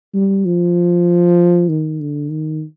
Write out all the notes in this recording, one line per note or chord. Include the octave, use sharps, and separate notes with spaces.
G3
F3
D#3
D3
D#3